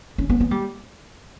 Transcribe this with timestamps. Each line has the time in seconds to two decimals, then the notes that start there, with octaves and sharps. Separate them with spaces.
0.18 C#4
0.30 B3
0.40 B3
0.51 G3